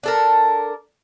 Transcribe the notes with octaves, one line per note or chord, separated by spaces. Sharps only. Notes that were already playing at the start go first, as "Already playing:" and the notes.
D4 A4 A#4